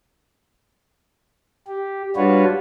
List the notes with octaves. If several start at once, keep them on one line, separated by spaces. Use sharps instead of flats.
G4
G3 D4 F4 F#4 B4 C#5